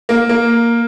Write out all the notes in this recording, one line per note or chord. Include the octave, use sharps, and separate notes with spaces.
A#3
A#3